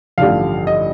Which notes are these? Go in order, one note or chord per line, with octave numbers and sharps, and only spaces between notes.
A1 G2 D3 F3 F5
D#5